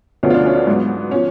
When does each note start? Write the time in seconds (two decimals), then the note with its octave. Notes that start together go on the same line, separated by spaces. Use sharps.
0.23 D2 D3 F3 B3 C#4
0.30 F4
0.34 D4
0.46 C#4
0.56 D4
0.67 G#2 F#3 B3
1.11 F3 C#4